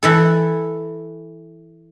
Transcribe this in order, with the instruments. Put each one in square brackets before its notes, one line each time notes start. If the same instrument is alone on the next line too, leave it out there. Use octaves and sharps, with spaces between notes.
[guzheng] E3 E4 A4